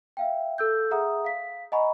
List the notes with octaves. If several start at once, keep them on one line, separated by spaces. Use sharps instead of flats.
E5 F5 G5
A4 E6 G6
G#4 E5 F#5 A#5 D#6
F5 B6
D#5 F#5 G#5 A#5 B5 C#6